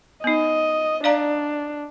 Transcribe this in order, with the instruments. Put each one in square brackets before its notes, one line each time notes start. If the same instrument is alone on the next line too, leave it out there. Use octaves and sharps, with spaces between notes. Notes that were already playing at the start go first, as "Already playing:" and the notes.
[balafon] B3 D#4 [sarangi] D#5
[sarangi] D4 [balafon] D5 F5 A#5